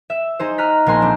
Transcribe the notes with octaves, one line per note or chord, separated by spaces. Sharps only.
E5
D#4 G#4 C5
D#5 A#5 F6 F#6 B6
A#1 A#3 F#5 G#5 C6 A#6
A3 C4 D4